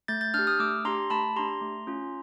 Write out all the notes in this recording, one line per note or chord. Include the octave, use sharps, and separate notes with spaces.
A3 G6 A6
G6 A6
D4 G4 F6 G6
D#6 F6
A3 D6 E6
D4 G4 A#5 C6
A3 A5 B5
D4 G4 A#5 C6
A3
C#4 F4